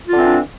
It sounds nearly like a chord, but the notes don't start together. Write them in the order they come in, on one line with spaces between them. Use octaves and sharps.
F4 D3 C4 E3 D4